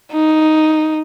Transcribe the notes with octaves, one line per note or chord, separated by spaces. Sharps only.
D#4